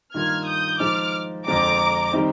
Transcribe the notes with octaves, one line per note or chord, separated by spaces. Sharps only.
G2 D#3 A#3 F4 F6 G#6
D#6 G6
F3 G#3 D#4 D6 F6
F2 D3 F3 G#3 A#5 D6
D#3 G3 C4 D#4